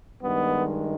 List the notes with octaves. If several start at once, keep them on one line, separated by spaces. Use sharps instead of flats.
G2 D#3 G#3 B3